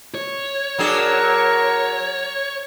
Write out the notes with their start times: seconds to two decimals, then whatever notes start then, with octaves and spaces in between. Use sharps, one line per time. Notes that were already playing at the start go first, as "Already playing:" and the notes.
0.15 C#5
0.78 F#3 D4 G#4 A#4